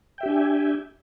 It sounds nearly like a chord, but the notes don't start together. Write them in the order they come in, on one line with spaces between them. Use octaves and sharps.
G5 E5 G4 D4 G#5